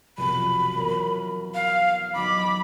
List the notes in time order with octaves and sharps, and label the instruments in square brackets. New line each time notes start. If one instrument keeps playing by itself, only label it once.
[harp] F1 B1 C#7 [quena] B5
[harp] E2 A#4 C#5
[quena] F5
[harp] F#3 D#4 [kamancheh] B5 [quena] D6